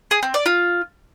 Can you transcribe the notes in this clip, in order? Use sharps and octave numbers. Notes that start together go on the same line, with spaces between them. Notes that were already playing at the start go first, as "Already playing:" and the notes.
G#4
C4
D5
F4